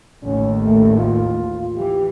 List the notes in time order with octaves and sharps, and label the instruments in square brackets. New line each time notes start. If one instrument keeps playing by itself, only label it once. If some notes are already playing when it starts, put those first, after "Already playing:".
[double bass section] A1 D#2 [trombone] C#4
[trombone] A3
F4
[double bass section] E3 [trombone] G4